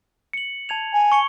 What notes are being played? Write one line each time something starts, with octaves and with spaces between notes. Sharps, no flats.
C#7 F#7
A5 G#6 F7
G#5
C#6 C#7 G7